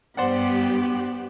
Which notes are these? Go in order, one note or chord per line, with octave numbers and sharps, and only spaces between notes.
G2 B3 G4 C5 D5 F#5